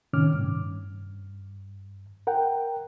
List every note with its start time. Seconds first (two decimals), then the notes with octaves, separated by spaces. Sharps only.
0.13 A2 C3 D#3 C#4 D6 F6
0.34 G2
2.27 A#4 F#5 G5